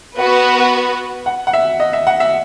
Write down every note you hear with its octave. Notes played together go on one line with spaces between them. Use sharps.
B3 F#4 B4 F#5
F#5
F#5
E5
D#5
E5
F#5
E5